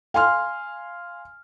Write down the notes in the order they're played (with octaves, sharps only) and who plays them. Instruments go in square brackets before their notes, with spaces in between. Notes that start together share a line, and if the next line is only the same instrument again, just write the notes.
[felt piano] F5 G#5 C6 F6